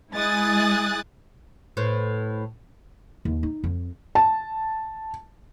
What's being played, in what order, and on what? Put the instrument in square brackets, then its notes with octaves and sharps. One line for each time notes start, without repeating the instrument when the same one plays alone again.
[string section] G#3 E4 G#5 D#6 F#6 A6
[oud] A2 B4 C5
[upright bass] D#2
D#4
F2
[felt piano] A5